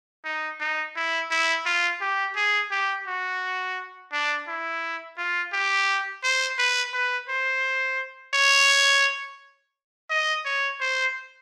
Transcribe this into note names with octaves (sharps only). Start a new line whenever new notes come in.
D#4
D#4
E4
E4
F4
G4
G#4
G4
F#4
D4
E4
F4
G4
C5
B4
B4
C5
C#5
D#5
C#5
C5